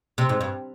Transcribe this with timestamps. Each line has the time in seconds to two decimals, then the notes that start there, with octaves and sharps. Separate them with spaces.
0.18 C3
0.29 G#2
0.41 G2